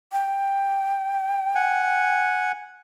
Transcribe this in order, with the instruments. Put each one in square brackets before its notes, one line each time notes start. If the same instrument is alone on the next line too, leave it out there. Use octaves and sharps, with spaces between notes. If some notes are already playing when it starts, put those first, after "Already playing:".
[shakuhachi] G5
[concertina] F#5 G#5